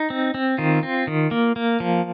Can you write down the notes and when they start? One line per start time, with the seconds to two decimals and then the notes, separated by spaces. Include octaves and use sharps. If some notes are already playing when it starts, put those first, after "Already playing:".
Already playing: D#4
0.10 C4
0.34 C4
0.58 D#3 F4
0.83 C4
1.07 D#3
1.31 A#3
1.56 A#3
1.80 F3